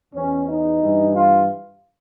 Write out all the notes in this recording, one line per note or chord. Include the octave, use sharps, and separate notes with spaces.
E2 B2 C#4
D#4
G2 E3
F4